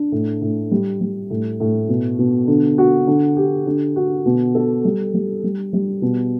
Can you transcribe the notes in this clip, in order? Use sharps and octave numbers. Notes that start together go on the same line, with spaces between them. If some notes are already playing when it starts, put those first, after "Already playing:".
Already playing: D4
A2
A2
G3
G3
A2
A2
B2
B2
D3
F#4
D3
G4
D3
F#4
B2
A4
G3
G3
G3
G3
B2